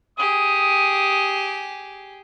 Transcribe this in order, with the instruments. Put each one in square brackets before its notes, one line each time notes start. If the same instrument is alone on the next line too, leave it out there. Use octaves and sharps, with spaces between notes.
[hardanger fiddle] G4 G#4 [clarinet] D#6